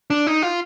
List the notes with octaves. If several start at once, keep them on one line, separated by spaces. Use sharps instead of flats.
D4
D#4
F4